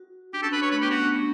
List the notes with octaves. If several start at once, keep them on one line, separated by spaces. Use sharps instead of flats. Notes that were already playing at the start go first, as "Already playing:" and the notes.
Already playing: F#4
D4 G4
C#4 A4
D4 B4
C#5
A3 B4
B3 G4
C#4 F#4
D4
C#4